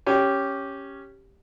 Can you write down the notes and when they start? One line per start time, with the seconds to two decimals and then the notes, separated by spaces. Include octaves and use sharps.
0.06 C#4 G4